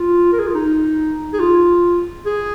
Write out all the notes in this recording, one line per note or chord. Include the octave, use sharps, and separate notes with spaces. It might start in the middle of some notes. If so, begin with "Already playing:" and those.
Already playing: F4
A#4
G#4
F4
D#4
G#4
F4
G#4